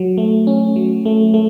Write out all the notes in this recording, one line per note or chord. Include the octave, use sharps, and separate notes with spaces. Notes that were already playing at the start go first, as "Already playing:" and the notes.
Already playing: F#3
A3
C#4
F#3
A3
A3